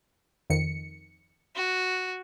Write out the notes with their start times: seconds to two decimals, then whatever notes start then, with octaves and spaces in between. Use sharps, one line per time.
0.50 F2 D#3 C#7
1.56 F#4